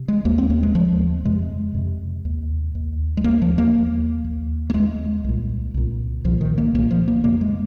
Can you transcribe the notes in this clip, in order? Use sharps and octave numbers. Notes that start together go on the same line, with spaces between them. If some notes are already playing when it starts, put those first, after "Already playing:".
Already playing: C3
G#3
D#2 A#3
C4
A#3
G#3
D#2 F3
F2 C3 G#3
F2 C3
D#2
D#2
G#3
D#2 A#3
F3
A#3
D#2
D#2
A#3
D#2 G#3
C2 A#2
C2 A#2
C2 A#2 F3
D#3
A#3
C2 A#2 A#3
F3
A#3
F2 C3 A#3
G#3